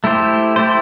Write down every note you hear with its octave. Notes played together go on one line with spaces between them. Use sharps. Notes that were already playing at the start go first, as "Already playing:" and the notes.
A3 E4 G4 C5
A3 E4 G4 C5